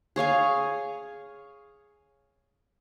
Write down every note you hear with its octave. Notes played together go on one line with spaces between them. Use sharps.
G#4 C#5 F5 G#5